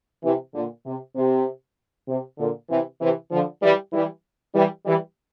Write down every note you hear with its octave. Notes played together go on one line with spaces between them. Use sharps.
C3 E3
A#2 D3
C3
C3
C3
A#2 D3
C3 E3
C3 E3
D3 F3
E3 G3
E3 G3
E3 G3
E3 G3